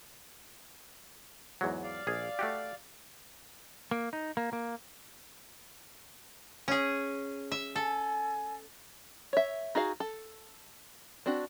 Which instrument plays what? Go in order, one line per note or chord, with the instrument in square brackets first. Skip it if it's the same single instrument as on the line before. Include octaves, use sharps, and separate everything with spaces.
[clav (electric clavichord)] E2 G#2 F#3
[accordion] D5 F5
[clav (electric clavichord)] A#1 G#4
A3 F#4 G4
[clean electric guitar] A#3
D#4
A#3
A#3
[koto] C#4 G#4
E5
[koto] A4 [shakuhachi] G#5
[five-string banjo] C#5 E5
D#4 F#4 G#4 F5
A4
C4 D4 F#4